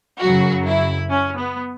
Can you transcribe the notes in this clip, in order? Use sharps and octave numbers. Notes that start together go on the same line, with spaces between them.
F#2 C#3 F#3 F#4
E4
C#4
B3